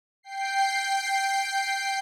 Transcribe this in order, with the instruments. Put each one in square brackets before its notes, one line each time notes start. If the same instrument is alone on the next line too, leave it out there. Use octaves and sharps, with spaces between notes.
[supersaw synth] G5 C7